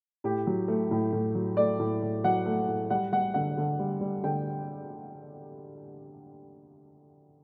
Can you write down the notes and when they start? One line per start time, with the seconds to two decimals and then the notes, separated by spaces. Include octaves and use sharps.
0.24 A2 G4
0.47 F#3
0.68 A3
0.91 A2
1.13 A2
1.35 F#3
1.57 A3 D5
1.80 A2
2.02 A2
2.24 F#3 F#5
2.46 A3
2.68 A2
2.90 G3 F#5
3.12 G3 F#5
3.34 D3 F#5
3.57 D3
3.79 G3
4.01 G3
4.23 D3 G5